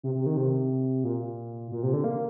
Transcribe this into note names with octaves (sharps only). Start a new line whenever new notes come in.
C3
C3
D#3
C3
A#2
A#2
C3
D3
A#3